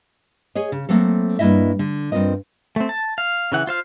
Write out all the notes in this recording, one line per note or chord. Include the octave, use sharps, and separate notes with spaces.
G#4 C#5 D#5
C#3
F#3 A3 A#3 C4 A4
G2 A#3 E4 D#5 E5
D3
G2 C4 F4 A#4 D#5
A3 C4
A5
F5
C#3 E3 F#5
F4 C5 F5